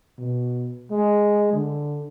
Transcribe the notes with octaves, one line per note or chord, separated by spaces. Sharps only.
B2
G#3
D3